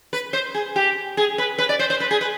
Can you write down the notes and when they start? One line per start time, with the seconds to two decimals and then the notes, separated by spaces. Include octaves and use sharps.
0.13 B4
0.33 C5
0.54 G#4
0.76 G4
1.17 G#4
1.38 B4
1.58 B4
1.69 D5
1.79 C5
1.90 C5
2.00 B4
2.11 G#4
2.21 B4